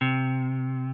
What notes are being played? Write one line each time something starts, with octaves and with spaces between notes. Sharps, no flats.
C3